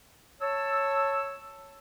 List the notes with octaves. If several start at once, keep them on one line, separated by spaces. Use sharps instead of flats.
C#5 A5 E6